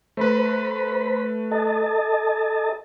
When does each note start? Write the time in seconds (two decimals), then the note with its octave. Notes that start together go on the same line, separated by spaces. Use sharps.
0.17 A3 B4 C5 B5
1.51 A4 D#5 A5